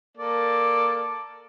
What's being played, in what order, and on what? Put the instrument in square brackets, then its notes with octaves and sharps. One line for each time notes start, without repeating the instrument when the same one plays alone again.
[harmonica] A#3 A4 D5